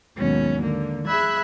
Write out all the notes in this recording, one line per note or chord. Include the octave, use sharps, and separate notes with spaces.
D#2 G#2 B2 F#3 C#4
D3 A#3
G#4 E5 B5 E6 F#6 G#6